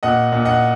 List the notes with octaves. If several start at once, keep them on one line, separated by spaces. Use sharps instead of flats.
A#2 D#5 F#5
A#2
D#5 F#5